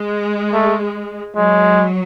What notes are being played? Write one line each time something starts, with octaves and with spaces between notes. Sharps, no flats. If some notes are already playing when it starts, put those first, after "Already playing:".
Already playing: G#3
A3
F#3 G#3